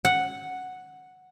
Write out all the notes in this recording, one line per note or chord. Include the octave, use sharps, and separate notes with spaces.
F#5